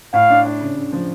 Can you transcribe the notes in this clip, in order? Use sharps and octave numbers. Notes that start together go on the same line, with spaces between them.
A2 F5
D4
D4
C#3
C#3
F3